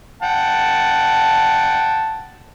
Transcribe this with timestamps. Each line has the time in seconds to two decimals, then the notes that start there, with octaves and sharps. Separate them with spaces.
0.22 F#5 G5 A5